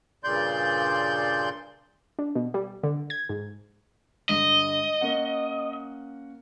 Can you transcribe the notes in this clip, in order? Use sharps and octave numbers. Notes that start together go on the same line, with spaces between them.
G2 A#2 C#3 D5 C6 G6
D4
B2
G3
D3
G#6
G#2
G2 D3 D#5
A#3 C#4 F#5